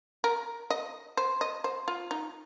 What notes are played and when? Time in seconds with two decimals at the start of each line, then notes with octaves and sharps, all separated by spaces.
0.24 A#4
0.70 D#5
1.17 C5
1.41 D#5
1.64 C5
1.88 F4
2.11 D#4